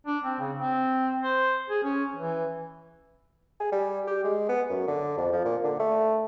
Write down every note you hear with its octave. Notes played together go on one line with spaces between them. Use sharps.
D4
C4
C#3
C4
C5
G#4
C#4
E3
G#4
G3
G4
G#3
B3
F#2
D3
F2
F3
A#2
D3
A3